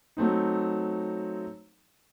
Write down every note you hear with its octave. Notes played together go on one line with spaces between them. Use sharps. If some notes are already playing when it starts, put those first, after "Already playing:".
F#3 A3 C4 D#4